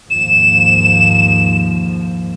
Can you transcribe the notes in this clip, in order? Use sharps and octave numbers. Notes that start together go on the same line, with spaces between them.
D#2 G#2 F3 E7